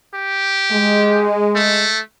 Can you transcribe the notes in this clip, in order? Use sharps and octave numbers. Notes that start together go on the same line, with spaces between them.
G4
G#3
A3